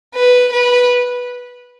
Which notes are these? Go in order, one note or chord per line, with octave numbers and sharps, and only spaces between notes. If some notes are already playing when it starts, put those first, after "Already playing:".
B4
B4